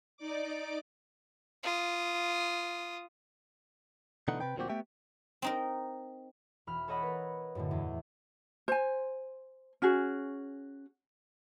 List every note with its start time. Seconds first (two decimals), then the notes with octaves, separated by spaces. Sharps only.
0.17 D#4 D5 D6
1.63 F4 D#6
4.28 B2 D3 E3 A3 D#4 F#5
4.40 C3 B4 G5
4.57 D2 A#2 F3 C4 F#4 G4
4.69 A3 B3 G4 E5 G5
5.42 C4 D#4 A#4
6.67 E1 B5 F6
6.88 A4 C#5 D#5 F#5 B5
7.03 A#4 B4
7.55 F#2 A2 D3
7.71 E2
8.68 C5 G#5
9.82 C#4 F#4 G#4